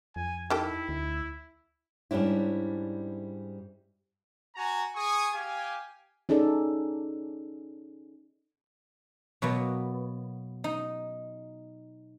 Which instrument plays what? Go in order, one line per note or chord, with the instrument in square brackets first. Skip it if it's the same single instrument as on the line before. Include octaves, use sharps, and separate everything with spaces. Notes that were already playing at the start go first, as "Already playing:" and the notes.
[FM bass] F2 [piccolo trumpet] G#5
[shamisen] D#3 G4 A4 [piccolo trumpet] E4
[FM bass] D2
[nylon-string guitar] G#2 G3 C#4 D4 E4
[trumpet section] F#4 G#5 A#5
G#4 G#5 C#6 D#6
G4 F5 G#5
[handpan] C#4 D#4 G#4 A4 D5
[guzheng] B2 F#3 A#3 B3
D#4